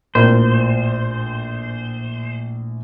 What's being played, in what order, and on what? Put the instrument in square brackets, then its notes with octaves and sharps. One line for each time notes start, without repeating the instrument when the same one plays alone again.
[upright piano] A#1 A2 A#4 [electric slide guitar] C5